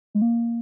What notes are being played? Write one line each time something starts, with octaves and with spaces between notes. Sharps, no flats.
G#3
A#3